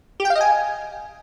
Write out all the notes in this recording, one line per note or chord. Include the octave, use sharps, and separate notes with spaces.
G4
G5
F5
D#5
G#5